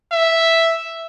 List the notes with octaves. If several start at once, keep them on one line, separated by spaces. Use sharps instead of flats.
E5